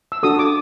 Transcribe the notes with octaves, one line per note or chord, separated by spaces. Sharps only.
E6
D4 F#4 A4 D#6
D6